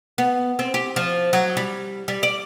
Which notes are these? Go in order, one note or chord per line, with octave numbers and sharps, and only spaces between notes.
B3
C4
G4
F3
F#3
G3
G3
D5